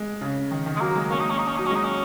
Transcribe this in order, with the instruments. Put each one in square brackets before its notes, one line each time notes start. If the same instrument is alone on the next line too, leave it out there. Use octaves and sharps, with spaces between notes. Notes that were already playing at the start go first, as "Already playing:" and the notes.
Already playing: [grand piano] G#3
C#3
D#3
D#3
[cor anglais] G#3
[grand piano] F#3 [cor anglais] A#3
[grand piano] G#3
[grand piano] A#3 [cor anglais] C#4
[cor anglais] D#4
C#4
D#4
C#4
[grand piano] F#3 [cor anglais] D#4
[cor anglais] C#4
[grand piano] G#3 [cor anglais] D#4
[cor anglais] C#4